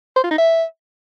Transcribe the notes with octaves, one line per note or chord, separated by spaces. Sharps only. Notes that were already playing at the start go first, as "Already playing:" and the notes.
C5
F4
D#4
E5